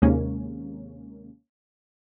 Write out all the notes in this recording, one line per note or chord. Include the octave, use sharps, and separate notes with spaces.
D#2 C3 G#3 A#3 C#4